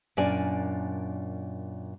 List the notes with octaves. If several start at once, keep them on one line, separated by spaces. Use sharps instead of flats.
F#2 A#2 D4 D5 G#5